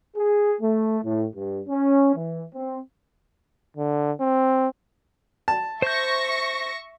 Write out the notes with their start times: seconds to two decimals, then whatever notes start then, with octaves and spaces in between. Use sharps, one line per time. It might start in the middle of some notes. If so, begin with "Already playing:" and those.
0.17 G#4
0.61 A3
1.03 A2
1.33 G2
1.67 C#4
2.14 E3
2.53 C4
3.77 D3
4.21 C4
5.48 A5
5.82 C5 E5 C#6 G6 A#6